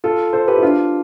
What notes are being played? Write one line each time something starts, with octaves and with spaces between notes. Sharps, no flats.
F4 A4
A4 C5
G4 B4
E4
D4 F4